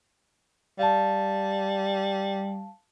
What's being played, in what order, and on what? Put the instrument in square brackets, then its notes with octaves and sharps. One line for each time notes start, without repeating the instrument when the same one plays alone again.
[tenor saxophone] G3 [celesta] F5 A5